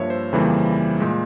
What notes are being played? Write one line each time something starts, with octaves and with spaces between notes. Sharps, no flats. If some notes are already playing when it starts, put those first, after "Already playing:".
Already playing: G2 F3 A#3 C#5 E5
C5
F2 C#3 E3 G3 A#3
A#2 G#3